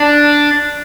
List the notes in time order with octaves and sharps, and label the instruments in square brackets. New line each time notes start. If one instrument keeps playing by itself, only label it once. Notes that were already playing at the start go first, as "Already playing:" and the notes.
Already playing: [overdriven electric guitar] D4